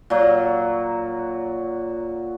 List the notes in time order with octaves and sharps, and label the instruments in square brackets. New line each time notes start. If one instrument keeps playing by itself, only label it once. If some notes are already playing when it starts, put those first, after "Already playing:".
[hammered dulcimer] A#2 F#3